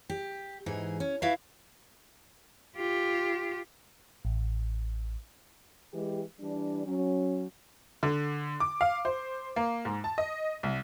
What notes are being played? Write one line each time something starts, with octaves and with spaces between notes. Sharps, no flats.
G4
G#2 E3 D#4 G#4
C#4
E4 F#4 B4 E5 F5
F4 G4
A1
E3 G#3 G4
E3 G3 D4
F#3 C#4
D3
D6
F5
C5
A#3
G#2
A5
D#5
C2